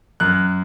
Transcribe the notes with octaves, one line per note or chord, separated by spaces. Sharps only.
F#2 F#6